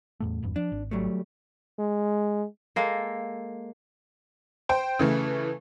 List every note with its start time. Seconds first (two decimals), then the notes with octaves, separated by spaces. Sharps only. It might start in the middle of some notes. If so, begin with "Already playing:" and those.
0.20 E2 A2 A3
0.43 G#1 E2 G2
0.56 F3 D4
0.72 G#1
0.91 F#3 G3 A3
1.79 G#3
2.76 G#3 A#3 A4
4.69 C5 G5
4.99 C#3 E3 A3